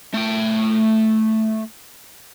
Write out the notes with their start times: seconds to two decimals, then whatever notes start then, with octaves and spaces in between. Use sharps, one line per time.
0.14 A3 G5